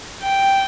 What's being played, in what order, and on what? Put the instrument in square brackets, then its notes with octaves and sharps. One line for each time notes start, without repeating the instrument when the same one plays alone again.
[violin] G5